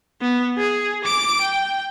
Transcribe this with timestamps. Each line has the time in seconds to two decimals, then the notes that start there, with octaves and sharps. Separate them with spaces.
0.22 B3
0.58 G#4
1.05 D6 D7
1.41 G5